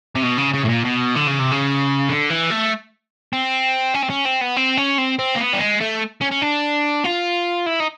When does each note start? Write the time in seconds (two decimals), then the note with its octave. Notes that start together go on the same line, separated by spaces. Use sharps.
0.16 C3
0.23 B2
0.38 C#3
0.54 C#3
0.65 A2
0.69 A#2
0.85 B2
1.16 D3
1.28 C#3
1.40 C3
1.52 C#3
2.09 D3
2.30 E3
2.50 A3
3.33 C4
3.94 C#4
4.03 C4
4.10 C#4
4.25 C4
4.41 B3
4.56 C4
4.77 C#4
4.98 C4
5.19 C4
5.35 A#3
5.39 B3
5.53 G3
5.59 G#3
5.80 A3
6.21 C#4
6.32 C#4
6.42 D4
7.04 F4
7.66 E4
7.80 D#4